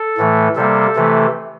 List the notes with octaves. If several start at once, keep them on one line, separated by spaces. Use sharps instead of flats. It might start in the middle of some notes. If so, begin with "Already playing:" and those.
Already playing: A4
A2 E3 A3
C3 G3 A#3 A4
C3 E3 A3